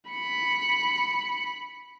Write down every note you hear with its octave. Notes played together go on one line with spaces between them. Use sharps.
B5 C#7